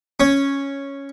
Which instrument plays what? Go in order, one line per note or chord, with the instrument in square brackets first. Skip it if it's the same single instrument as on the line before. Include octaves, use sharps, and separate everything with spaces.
[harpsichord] C#4